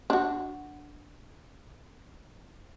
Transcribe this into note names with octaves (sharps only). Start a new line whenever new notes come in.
D4 F#4